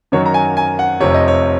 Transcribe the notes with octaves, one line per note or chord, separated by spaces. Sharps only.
F#2 D#3 F#3 C#5
A#5
G#5
G#5
F#5
F1 F2 C3 C#5
D#5
C#5